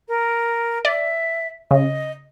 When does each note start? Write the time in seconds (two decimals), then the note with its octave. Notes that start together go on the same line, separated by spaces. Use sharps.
0.08 A#4
0.85 D5 E5
1.71 C#3 D#5